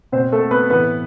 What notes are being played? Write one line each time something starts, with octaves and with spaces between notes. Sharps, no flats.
B2 C4 C5
A3 A4
B3 B4
A2 E3 B3 B4